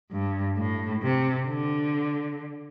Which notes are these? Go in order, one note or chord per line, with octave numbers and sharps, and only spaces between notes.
G2
A2
C3
D3